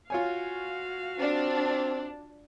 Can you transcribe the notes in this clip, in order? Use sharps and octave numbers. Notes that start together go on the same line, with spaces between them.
F4 F#4 C#5 F5 G#5
C4 D4